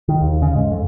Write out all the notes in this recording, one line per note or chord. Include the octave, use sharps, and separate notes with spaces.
D#3
D#2
C#3
G#2
F2